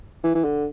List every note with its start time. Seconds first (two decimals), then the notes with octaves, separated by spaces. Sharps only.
0.24 E3
0.35 E3
0.44 D3